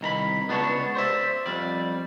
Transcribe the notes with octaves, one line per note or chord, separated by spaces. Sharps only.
C2 D#3 A#5 B5
C#2 B3 D4 D#4 C#5 A5
C5 D5 E5
F2 G3 D5